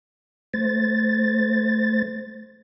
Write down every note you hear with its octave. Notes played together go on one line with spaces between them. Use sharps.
A3 C5 A6